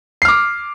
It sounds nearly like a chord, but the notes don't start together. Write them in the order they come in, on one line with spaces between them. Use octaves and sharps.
C7 F6 D6